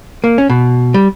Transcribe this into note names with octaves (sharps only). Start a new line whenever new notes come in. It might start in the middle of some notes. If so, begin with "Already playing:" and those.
A#3
C#4
B2
G3